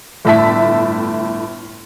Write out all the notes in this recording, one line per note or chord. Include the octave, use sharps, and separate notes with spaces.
G1 A2 E5 A5 B6